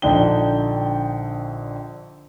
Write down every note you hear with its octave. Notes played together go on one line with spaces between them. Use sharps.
A#1 D3 D#4 G5 G7